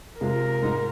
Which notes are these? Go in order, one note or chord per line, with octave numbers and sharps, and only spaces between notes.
C3 G#3 F4 A#4
G#2 G#3 D#4